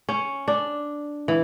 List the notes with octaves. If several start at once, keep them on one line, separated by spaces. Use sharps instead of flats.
C#4
D4
E3